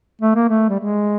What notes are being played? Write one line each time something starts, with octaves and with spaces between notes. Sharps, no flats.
A3
A#3
A3
G3
G#3